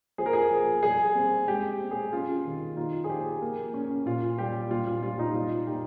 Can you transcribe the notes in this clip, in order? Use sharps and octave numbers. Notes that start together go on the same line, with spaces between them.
F3 G#4
A#4
G#4
F3
G3 G#4
C4
G#3 G4
C4
G#4
C#4 F4
D#3
D#4 F4
G#4
F3 G4
A#3
C#4
A#2 F4
G3 G4
A#2 F4
F4
G3 F4
D#4
D#4 F4
D#4 G4